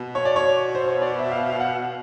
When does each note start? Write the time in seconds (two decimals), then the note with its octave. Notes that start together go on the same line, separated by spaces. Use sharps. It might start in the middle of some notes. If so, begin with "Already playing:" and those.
Already playing: B2
0.15 C#5
0.25 D5
0.36 C#5
0.75 C5
0.88 C#5
1.02 D5
1.19 E5
1.31 F5
1.50 F5
1.60 F#5